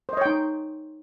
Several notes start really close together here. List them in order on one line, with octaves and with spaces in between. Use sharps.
C5 D#5 C#5 G5 D#4